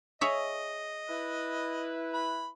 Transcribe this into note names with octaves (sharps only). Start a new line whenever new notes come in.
G#4 C#5 D#5 E5
E4 B4
B5